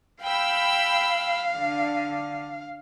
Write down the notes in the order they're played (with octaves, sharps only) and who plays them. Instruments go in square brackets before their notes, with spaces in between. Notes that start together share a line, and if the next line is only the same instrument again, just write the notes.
[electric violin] F5 [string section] G5 B5 E6
[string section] D3